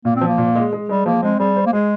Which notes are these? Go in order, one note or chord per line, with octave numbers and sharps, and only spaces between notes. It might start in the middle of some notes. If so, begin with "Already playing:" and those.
A#2 A#3
C4
F3
A#3
A#2
G#3
G#3
G3 G#3
F3 A#3
G#3 C4
G3 G#4
C5
A#3
G#3 G#4